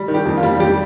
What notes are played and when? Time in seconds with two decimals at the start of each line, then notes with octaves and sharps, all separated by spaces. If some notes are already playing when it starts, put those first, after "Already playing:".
Already playing: G3
0.08 D#3
0.14 G4
0.25 F2
0.37 F4
0.43 G3
0.60 G3 G4